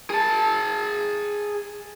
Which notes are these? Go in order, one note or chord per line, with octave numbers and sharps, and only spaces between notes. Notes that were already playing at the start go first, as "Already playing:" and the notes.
G#4 A5